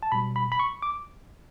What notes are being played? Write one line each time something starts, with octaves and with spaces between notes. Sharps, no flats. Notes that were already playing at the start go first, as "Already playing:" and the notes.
A5
B2 G3 B5
B5
B5
C#6
D6